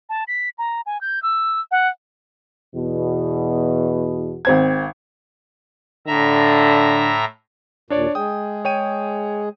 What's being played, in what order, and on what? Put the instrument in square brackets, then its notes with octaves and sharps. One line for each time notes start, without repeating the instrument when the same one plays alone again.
[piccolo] A5
B6
A#5
G#5
G6
E6
F#5
[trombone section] E2 B2
[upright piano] G#1 C4 G#6
[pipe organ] A2 E5 A#5 [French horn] D3
[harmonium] D#2 A#2 [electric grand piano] D4 C#5 D5
[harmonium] G#3 G#4 [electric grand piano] G5 D#6
[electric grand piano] C#5 G5 D#7